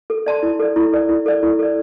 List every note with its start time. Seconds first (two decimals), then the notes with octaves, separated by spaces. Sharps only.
0.10 A4
0.26 D5 A5 C6
0.43 E4
0.60 A4 D5
0.76 E4
0.93 A4 D5
1.09 E4
1.26 A4 D5
1.43 E4
1.59 A4 D5